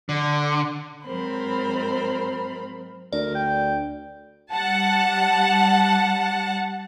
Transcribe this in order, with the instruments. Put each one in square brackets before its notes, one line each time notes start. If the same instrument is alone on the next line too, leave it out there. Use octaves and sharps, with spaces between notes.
[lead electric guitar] D3
[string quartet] G#2 F#3 C4 A#4 C5 B5
[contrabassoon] D2 [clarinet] A#4 [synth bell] D5
[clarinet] G5
[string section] G3 F#5 A5